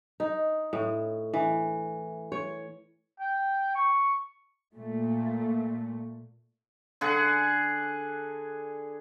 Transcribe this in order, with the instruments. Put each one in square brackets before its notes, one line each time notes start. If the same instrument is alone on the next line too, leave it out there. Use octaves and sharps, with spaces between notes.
[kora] D#4
A2
E3
C#5
[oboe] G5
C#6
[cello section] A#2 A3
[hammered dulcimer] D3 G#4 F#5